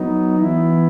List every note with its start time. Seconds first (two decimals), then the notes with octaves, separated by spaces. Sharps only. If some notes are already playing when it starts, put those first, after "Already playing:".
Already playing: F#3 B3 D#4
0.37 E3 B3 E4